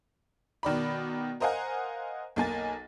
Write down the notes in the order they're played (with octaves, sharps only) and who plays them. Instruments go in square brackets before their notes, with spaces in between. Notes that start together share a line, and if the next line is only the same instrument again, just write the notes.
[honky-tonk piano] B2 D#3 D5 B5
A#4 C5 D#5 F5 F#5 G#5
B1 A#3 G#5 A6